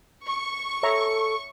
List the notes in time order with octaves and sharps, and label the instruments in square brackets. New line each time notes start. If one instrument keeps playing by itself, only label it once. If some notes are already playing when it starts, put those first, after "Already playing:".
[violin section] C#6
[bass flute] A4 [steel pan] C#5 E5 A#5